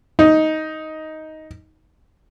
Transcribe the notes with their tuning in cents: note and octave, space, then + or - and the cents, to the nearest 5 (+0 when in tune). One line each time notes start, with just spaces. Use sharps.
D#4 +10